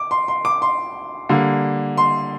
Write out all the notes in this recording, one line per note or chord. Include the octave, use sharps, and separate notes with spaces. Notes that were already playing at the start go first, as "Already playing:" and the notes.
Already playing: D6
C6
C6
D6
C6
D3 G3 A#3
C6